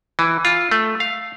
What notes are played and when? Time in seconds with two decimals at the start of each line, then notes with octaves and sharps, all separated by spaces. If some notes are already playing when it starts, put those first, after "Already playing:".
0.19 E3
0.45 F4
0.71 A3
1.00 F5